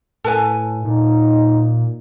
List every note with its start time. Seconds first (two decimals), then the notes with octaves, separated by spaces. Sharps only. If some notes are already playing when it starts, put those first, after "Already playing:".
0.24 A2 A4 B4 G#5
0.85 A#2 D#4